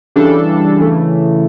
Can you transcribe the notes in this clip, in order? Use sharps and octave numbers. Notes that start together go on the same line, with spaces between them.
C#3 E3 G3 D4 A4
C#3 E3 A3